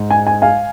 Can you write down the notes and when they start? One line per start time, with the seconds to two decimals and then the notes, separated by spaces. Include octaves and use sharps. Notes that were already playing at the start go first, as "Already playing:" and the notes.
Already playing: G#2
0.10 G#5
0.27 G#5
0.42 F5 G#5